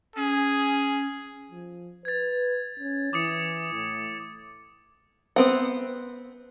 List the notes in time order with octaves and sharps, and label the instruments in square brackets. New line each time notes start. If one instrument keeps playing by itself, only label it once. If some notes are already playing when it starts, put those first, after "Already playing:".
[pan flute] C#4 [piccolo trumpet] G#4
[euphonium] F3
[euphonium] B4 [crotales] G#6 A6
[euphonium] C#4
[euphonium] E3 [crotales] D6 D#6 C#7
[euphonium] A2
[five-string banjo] B3 C4 F#5